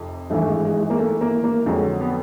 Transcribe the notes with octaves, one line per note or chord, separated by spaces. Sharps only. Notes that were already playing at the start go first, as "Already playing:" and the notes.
Already playing: F1 F2 C3
G#1 G2 E3 A3
A3
G#3
G#3
G#3
A#3
A3
A#3
A#3
F2 D3 F#3 G#3
B3